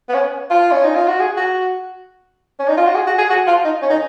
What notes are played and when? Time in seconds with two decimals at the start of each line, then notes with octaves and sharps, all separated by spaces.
0.09 B3
0.14 C#4
0.50 F4
0.72 C#4
0.84 D#4
0.95 F4
1.08 F#4
1.20 G#4
1.37 F#4
2.59 C#4
2.68 D#4
2.77 F4
2.86 F#4
2.95 G#4
3.06 F#4
3.18 G#4
3.29 F#4
3.47 F4
3.65 D#4
3.82 C#4
3.90 D#4